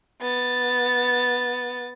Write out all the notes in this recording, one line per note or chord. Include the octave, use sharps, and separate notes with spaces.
B3 A6